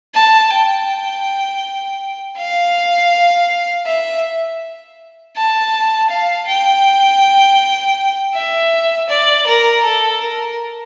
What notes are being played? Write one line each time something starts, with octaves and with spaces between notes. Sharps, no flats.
A5
G5
F5
E5
A5
F5
G5
E5
D5
A#4
A4
A#4